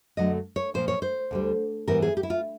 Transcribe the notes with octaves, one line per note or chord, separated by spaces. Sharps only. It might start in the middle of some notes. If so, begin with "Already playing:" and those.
F#2 D3 F#3 A3 D4 D#5
C#5
A#2 F3 A#3 C5
C#5
C5
D2 D3 G3
G#2 E3 G3 B3 A#4
G#4
G4
E4
F4